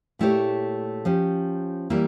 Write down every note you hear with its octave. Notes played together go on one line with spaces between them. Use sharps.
A#2 A3 E4 G4 C#5
F3 C#4 G4
E3 G3 A#3 E4